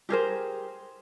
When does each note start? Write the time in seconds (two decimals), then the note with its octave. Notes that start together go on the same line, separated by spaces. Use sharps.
0.09 G4 G#4 A#4 C5